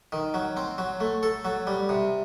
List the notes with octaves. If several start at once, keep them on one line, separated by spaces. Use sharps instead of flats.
D#3
F#3
C4
F#3
A3
A4
F#3
G3
C3